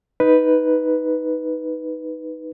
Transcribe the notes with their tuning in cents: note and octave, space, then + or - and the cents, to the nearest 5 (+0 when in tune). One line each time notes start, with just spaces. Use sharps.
D#4 +10 B4 +0